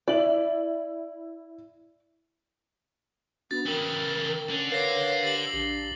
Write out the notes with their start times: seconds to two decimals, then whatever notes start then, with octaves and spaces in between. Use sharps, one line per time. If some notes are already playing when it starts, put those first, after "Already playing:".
0.08 E4 D5 E5 F#7
3.51 B3 D4 F#4 A6
3.67 C#3 E3 A#4 G5
4.50 D3 C#4
4.72 A#4 B4 C#5 F5 D6 A#6 C7
5.23 G4 A6 F#7
5.53 A#1 D4 G4